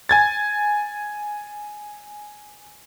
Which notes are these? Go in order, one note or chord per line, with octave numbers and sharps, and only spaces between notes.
G#5 G#6 A6